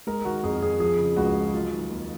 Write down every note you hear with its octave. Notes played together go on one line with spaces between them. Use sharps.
G#3 A#4
D#3 F#4
F2 G#4
F2 G#4
F3 G#4
C#3
C#2 F#4
G#3
F#3 F4
D#3
D#2